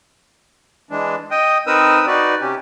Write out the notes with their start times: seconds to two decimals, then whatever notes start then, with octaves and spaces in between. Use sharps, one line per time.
0.91 E3 G#3 D4
1.31 D#5 G5 D#6
1.67 C4 D#4 A#4 B4 D#6 E6
2.07 D#4 F#4 B4 D5
2.41 C3 C#4 G4